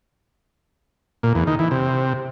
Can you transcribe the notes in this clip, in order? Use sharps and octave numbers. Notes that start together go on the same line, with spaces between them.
A#2
E2
D#3
E3
C3